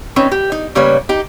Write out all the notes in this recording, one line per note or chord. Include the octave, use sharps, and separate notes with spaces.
C4 C#4 D#4 B4
G4
D#4
C#3 G3 A#3 B4 C#5
D#4 G4